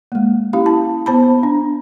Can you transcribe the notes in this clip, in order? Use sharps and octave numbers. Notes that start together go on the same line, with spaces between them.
G#3 A#3
C#4 E4 G4 F5
A5
B3 C5 A5 B5
D4